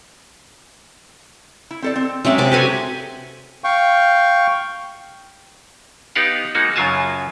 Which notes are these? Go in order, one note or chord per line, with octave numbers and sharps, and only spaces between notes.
E4
C4 A4 D5
C4
F#3 G#3 C4 C#4 D5 E5
C3 D5
C4 F#4 G4 A4 B4 G#5
F5 G5 C#6
B3 D#4 G4 F5 F#5
G#3 A#3 D#4 F#4
F#2 C#3 F#3 F4 G#5 A5